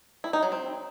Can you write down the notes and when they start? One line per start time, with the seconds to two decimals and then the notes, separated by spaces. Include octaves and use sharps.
0.24 E4
0.33 D#4
0.43 F#3
0.52 C4